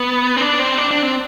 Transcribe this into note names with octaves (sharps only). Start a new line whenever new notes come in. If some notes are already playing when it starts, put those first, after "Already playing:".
Already playing: B3
C4
D4
C4
D4
D4
C4